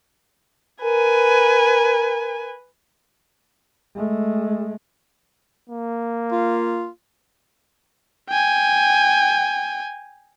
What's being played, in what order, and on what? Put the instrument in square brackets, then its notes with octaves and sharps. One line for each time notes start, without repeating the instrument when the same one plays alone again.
[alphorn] A#4 [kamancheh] B4 G#5
[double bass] G#3 A3
[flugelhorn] A#3
[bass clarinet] F4
[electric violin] G5 G#5